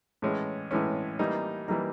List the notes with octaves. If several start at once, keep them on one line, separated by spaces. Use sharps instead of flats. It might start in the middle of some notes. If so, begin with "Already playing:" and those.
A2 E3 G#3 C#4
A2 E3 G#3 C#4
E3 G3 A#3 D#4
E3 G3 A#3 D#4